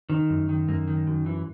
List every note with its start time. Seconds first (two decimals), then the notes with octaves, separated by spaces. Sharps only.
0.10 D#3
0.30 F#2
0.49 D#3
0.68 F#2 A#3
0.87 D#3
1.07 F#2
1.26 E3